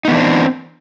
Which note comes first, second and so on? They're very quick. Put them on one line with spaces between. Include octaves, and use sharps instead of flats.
D#4 B3 E3 D4 C4